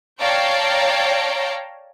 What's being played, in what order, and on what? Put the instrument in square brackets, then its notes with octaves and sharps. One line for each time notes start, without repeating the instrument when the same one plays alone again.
[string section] C#5 D5 F5 G5 A5 A#5